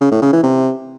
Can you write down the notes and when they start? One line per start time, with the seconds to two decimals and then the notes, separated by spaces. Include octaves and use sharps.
0.01 C#3
0.12 A2
0.22 C#3
0.33 E3
0.43 C3